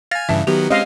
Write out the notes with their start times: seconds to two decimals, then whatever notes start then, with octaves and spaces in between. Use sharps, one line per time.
0.11 F5 G#5 F6 A6 A#6
0.29 G2 C#3 E3 E5 A5
0.47 D#3 F#3 B3 G4
0.70 G#3 C4 C#4 D#5 F5